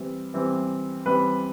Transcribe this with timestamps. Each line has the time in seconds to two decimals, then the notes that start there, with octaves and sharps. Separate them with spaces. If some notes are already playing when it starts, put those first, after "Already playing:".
Already playing: E3 G3 C4
0.34 E3 G3 C4
1.06 E3 G3 C4 B4